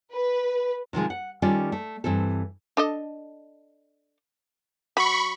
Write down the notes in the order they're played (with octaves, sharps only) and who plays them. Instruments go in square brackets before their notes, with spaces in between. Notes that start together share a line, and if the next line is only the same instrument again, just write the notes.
[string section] B4
[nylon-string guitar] C3 D#3 F3 G#3
F#5
D#3 G3 C#4 F4 A4 D5
A3
G2 E3 C4 A4
[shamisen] D4 A4 D#5
[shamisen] F#3 [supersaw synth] B5 C#6